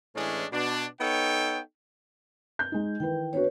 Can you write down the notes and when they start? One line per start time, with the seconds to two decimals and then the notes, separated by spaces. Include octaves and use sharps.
0.16 A2 E3 G#3 C#4 D4
0.53 B2 D4
1.01 B3 D#4 A4 C#5 G5
2.59 G6
2.72 G#3 D#4
3.00 D#3 E3 B4 G5
3.33 B3 D4 F#4 B4 C#5